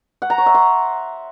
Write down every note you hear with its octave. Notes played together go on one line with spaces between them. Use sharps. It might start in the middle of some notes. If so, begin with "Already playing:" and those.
F#5
A#5
C#5
E5
C6